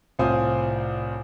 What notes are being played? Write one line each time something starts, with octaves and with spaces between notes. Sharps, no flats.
C2 A2 F4 C5 G#5 D#6